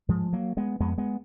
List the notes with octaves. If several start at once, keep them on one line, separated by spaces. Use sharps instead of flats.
G#2 F3 G#3
F#3 A#3
G#3 B3
F2 G#3 B3
G#3 B3